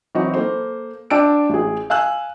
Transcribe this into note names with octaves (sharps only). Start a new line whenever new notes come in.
E3 F#3 C4 D#4 F#4
A#3 A4 C5
D4 G5 A5 E6 D7
A1 G#4
F5 G#5 E6 F#6